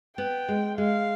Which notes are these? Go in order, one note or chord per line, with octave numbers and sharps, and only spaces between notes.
B3 G5
G#3
G#3 F5